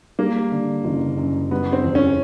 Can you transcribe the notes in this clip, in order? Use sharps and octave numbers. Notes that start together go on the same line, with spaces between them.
G3 A#3
D3
F#1
F#2
G3 B3
C4
E2
C#4